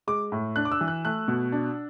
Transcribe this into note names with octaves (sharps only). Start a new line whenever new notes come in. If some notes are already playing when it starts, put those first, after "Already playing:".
G#3 D6
A2
D4 F#6
D6
E6
E3
F#6
A3 F#6
B2
D4